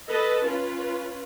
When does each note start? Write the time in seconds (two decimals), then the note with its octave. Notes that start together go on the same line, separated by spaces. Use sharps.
0.10 A4 B4 D#5 A5
0.46 C#4 F4 B4